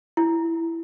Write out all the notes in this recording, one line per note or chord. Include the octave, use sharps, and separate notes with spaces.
E4